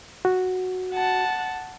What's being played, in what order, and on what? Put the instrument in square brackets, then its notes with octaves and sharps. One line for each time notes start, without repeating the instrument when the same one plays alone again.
[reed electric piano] F#4
[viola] F#5 A5